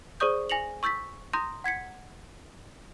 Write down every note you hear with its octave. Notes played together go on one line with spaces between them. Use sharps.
G#4 C5 D5 C#6 D#6 G6
G#5 A#6 C#7 F7 F#7
C#6 E6 G6 A6 B6
A#5 C6 D#6 G6 A#6
F#5 G#6 B6 C#7